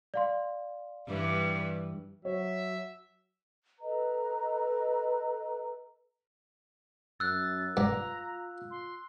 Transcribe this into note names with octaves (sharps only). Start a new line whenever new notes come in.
D5 F5 C6
G2 E3 G3
F#3 C#5 E5
A4 B4 D#5 A#5
F#2 E6 F#6 A6
G2 F4 A#5
C6